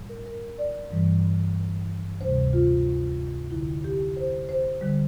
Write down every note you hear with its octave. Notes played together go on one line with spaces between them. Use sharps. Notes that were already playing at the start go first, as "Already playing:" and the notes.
Already playing: A2 G3
A#4
A#4
D5
G2 E3 G3
D2 C3 G3 C5
F4
F2 D3 F3 E4
G4
C5
C5
D3 G3